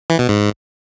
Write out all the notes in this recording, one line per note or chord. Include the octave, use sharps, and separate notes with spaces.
E3
B2
G#2